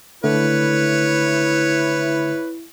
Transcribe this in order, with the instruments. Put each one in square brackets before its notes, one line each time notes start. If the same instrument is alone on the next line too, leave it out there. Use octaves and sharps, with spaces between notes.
[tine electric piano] D3 A3 [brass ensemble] E4 [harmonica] B4 C#5